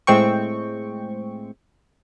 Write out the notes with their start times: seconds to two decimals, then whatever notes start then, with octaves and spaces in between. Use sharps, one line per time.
0.07 A2 G#3 C4 G5 C#6